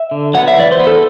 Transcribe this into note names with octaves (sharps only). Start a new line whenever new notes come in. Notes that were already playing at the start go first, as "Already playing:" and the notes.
Already playing: E5
D3
F#3 B3 F#5
E5
E3 D5
C5
B3
A4